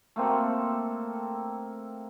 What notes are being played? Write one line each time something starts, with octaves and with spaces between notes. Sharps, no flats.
A3 A#3 C4 A4